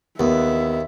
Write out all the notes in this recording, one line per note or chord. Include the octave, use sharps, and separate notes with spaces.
D#2 B3 E5